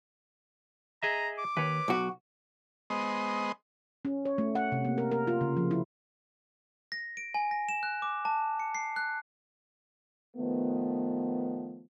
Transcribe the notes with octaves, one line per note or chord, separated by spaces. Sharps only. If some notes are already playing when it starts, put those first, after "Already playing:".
G#4 D#5 E5 A#5
D6
D#2 B4 C#5
B1 F#4
G#3 B3 C5 D#5
C#4
C#5
A3
F#5
C3
A#3
A#4
A#4
F4
C#3
F3
E4
A#6
D7
G#5
A#6
E7
F#6
D6
A5
C#7
C7
F#6
D#3 F3 A3 B3